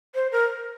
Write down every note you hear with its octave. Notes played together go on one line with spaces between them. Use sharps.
C5
A#4